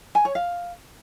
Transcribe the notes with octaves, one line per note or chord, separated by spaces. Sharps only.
G#5
C#5
F5